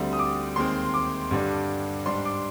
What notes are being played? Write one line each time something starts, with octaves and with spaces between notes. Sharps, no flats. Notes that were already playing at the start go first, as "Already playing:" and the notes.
Already playing: D2 D3 G3 C4
D#6
D6
D#2 D#3 G#3 C4 C6
D6
G2 D3 G3 D4
G#2 G3 D4 C6
D6